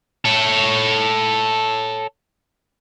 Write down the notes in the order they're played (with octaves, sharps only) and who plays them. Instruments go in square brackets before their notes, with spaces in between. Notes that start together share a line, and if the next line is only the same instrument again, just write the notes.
[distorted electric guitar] A4 C#5